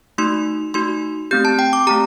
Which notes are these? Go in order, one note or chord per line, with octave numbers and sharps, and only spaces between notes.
A3 D#4 F#4 C6
A3 D#4 F#4 C6
A3 C4 G4 G6
A5
G5
D6
A3 C4 G4 A#5